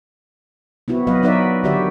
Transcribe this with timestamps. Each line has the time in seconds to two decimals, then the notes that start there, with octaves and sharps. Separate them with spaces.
0.88 B3 C4 E4 F#4
1.07 F#3 B3 B4 D#5 F5
1.23 B3 D#4 F#4 B4 D5 E5
1.64 D3 D#3 F#4 G4 D5 E5